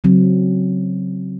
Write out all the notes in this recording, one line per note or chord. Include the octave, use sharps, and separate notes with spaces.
C#3 F#3 C4